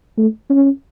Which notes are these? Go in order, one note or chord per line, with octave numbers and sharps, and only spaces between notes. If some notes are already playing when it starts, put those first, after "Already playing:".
A3
C#4